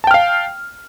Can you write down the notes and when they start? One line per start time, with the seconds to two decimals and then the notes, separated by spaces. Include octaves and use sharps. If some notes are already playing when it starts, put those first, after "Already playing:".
0.04 A5
0.07 G5
0.11 F6
0.14 F5